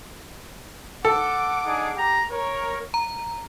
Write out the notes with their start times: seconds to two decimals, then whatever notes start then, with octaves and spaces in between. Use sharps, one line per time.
1.05 A4 F#5 D6
1.65 D4 D#4 G#4
1.96 G4 A#5
2.31 A#4 C#5
2.94 A#5